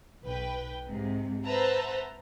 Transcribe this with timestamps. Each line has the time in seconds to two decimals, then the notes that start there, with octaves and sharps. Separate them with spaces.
0.25 B1 B4 G5
0.91 G#2 C3
1.46 B4 C5 E5 F#5 A5 A#5